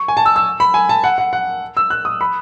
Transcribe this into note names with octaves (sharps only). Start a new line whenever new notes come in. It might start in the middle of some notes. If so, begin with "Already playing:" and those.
Already playing: C#6
G#5
A5
E6
E6
B5
G#5
A5
F#5
F#5
F#5
E6
F#6
D#6
B5